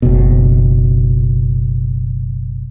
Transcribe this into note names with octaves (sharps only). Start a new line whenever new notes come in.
F#1 B2